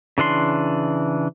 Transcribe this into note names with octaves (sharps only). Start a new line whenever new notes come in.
C#3 E3 D4 C6